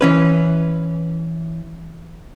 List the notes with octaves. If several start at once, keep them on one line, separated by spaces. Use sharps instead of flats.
E3 C#4 B4